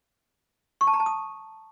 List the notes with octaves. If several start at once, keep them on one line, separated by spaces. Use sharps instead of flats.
C#6
A5
A#5
A5
D#6